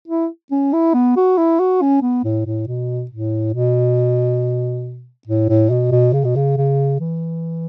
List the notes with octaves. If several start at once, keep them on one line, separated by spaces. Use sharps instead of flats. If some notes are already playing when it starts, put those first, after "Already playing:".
E4
C#4
E4
B3
F#4
E4
F#4
C#4
B3
A2
A2
B2
A2
B2
A2
A2
B2
B2
C#3
B2
C#3
C#3
E3